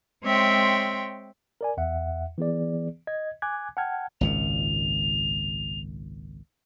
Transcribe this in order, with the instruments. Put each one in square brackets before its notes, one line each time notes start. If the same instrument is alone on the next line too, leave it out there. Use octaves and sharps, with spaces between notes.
[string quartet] G#3 C4 C#5 E5 G5 C6
[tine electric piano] A#4 D5 G#5
E2 E5 F#5
E3 B3 G#4 D5
D#5 G#6
G#5 D6 F#6 G#6
F#5 G5 A5 F6 G#6
[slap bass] G#1 C#2 A#2 [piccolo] F7